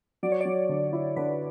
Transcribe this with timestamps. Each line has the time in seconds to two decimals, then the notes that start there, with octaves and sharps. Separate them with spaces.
0.23 F#3 D5
0.32 C#5
0.41 F#3 D5
0.69 D3
0.93 E4
1.16 D3 B4